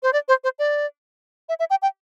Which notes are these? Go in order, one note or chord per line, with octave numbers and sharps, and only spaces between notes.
C5
D5
C5
C5
D5
E5
E5
G5
G5